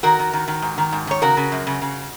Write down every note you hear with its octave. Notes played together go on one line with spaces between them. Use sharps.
D#3 F#4 A#4
D#3
D#3
D#3
G#2
D#3
G#2
D#3 C#5
C#3 F#4 A#4
C#3
F#2
C#3
C#3